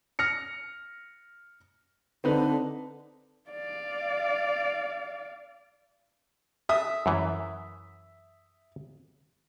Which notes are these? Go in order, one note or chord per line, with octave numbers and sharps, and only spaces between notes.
F6 A#6 C#7
D3 C4 D#4 B4
D5 F5
E5 D#6
F#2 E3